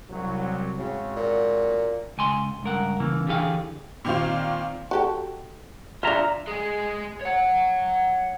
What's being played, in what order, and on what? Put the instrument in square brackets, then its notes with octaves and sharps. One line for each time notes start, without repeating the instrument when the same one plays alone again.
[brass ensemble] C2 F#3
[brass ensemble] G#2 C4 F#4 [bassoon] C#3
[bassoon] A#2
[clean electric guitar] C#2 G#5 C6
C#2 G2 A#4 F#5
C#3 E3 A#3
D3 E3 G4 G#4 F5
[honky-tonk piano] A#2 D#3 C4 F4
[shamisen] F#4 G4 A4
[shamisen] D4 F5 [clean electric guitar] F4 E5 A#5
[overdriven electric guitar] G#3 G#4
C#5 F#5